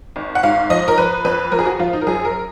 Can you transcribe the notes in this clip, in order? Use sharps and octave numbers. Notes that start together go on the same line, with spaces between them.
G#1
F#5
G#2 F5
F3 D#5
A#4
F3 B4
F2 B4
F3 A#4
G#4
F#4
F3 F4
D#4
A#4
F#2 G#4
A#4